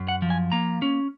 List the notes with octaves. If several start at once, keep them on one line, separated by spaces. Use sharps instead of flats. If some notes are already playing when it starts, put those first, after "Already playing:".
Already playing: F#2
F#5
F3
G#5
A#3 A#5
C#4